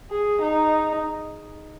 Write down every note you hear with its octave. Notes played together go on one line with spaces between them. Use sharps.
G#4
D#4